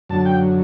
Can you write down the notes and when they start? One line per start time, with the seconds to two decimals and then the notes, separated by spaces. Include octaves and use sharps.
0.10 F#2 D3 F#3 A5
0.25 G5